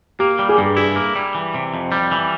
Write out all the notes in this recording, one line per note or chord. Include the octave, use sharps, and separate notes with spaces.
A#3 G4
G3
G#4
G2
E4 G#4
A#3
G3
E3
C3
F2
G3
E3